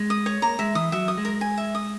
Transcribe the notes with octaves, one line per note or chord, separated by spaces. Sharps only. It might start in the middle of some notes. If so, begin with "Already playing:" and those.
Already playing: G#3
D#6
C#5
A#3 A#5
G#3 E5
E3 D#6
F#3 E5
D#6
G#3
A#4
G#5
E5
D#6